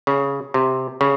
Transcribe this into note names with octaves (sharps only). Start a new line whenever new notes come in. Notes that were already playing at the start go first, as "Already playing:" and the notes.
C#3
C3
C#3